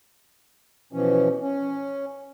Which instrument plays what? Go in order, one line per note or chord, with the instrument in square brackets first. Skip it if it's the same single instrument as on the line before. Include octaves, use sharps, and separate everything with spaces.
[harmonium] B2 E3 F3 C#4
C#4